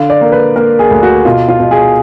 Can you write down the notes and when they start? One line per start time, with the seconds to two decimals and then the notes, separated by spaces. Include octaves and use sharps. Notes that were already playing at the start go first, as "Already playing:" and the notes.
Already playing: D3 F5
0.10 D5
0.21 A#3
0.32 B4
0.56 A#3 A#4
0.79 G#4
0.91 D2
1.03 F#4
1.25 B2 F4
1.49 F4
1.60 B2
1.71 G#4